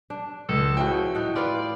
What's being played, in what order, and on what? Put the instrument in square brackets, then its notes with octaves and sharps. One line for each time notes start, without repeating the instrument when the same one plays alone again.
[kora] D4
[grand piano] C#2 [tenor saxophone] A4
[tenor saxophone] C#3 [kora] F3 E4 F#4 [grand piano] G5
[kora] A2 F#5 [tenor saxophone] D#4
[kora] F4 B4 F5 [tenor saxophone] D5